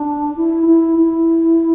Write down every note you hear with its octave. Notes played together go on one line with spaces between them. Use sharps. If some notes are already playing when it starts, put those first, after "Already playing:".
Already playing: D4
E4
E4
E4